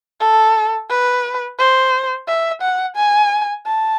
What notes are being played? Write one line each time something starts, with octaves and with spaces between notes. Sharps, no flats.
A4
B4
C5
E5
F#5
G#5
A5